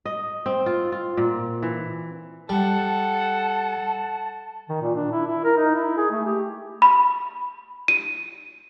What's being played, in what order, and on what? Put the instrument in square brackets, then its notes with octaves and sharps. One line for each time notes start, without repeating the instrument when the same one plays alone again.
[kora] D#5
C4
F4
F4
A#2
E3
[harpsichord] G3 [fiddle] A4 F#5 [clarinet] A5
[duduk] D#3
A#2
D4
E4
E4
A#4
D#4
E4
G#4
A3
G4
[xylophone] B5
D#7